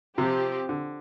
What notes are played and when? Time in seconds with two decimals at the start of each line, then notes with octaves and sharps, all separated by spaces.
0.18 C3 F3 C4 G4
0.69 D3